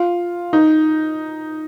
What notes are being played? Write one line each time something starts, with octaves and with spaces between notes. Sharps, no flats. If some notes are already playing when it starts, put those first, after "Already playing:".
Already playing: F4
D#4